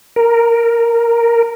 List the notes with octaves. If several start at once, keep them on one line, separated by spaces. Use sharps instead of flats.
A#4